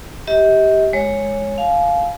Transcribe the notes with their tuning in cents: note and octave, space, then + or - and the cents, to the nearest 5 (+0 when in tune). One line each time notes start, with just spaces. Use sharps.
G4 -5 D#5 +45
G#3 +0 C#5 -5
F5 +0 G#5 +40